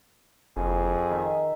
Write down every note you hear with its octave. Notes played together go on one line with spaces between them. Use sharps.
F#1 F2 G#4
D#3 D#4 E5